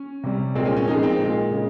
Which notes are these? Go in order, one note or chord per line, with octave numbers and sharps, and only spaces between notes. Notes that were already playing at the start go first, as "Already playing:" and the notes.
Already playing: C#4
C3 G3
A#2 G#3 C4
C#4
C#4
A#2 F3 G#3 D#4
C4
A#2 G#3
C#3 G#3